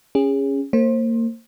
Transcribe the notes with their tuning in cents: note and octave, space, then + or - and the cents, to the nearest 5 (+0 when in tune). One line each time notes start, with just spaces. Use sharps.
C#4 +0 G#4 -25
A#3 -30 C5 +25